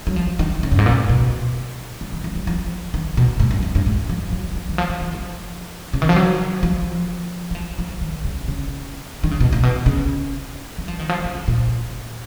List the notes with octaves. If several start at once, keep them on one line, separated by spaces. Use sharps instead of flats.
F#3
F3
D#3
C#3
F#2
G#2
A#2
B2
C#3
D#3
F3
F#3
F3
D#3
B2
G#2
F#2
F2
F#2
G#2
F3
F#3
F3
D#3
F3
F3
F3
F3
C#3
D#3
F3
F#3
F3
F#3
F3
F3
D#3
C#3
C#3
D#3
C#3
B2
A#2
B2
C#3
F#3
F3
D#3
F3
C#3
A#2